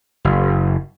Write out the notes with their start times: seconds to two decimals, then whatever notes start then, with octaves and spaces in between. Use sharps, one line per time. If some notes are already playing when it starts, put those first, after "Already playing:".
0.25 F#1